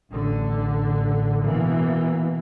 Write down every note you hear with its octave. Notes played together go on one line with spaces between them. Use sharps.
A1 D3
B2 E3 A#3